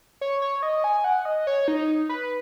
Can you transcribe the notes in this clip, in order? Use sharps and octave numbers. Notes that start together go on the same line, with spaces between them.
C#5
C#5
D#5
G#5
F#5
D#5
C#5
D#4
B4